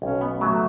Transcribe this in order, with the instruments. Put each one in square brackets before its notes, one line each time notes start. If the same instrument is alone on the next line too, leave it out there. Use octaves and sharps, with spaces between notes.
[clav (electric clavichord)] B1 [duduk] C#4
[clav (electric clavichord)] B3
[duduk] A3
[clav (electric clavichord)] F#3